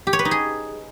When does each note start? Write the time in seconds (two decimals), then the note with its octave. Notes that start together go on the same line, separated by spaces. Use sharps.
0.07 G4
0.13 C#5
0.19 B4
0.25 D#4
0.31 G#4